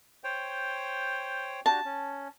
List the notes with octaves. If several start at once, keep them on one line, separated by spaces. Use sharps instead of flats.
C5 C#5 G5
D4 F#4 G4 A5
C#4